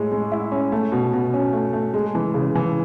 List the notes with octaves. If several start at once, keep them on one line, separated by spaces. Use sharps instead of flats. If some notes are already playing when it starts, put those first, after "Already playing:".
Already playing: A2 G#3
G#3
E4
C#4
A3
B2
B2
C#4
A3
A3
G#3
E3
C#3
E3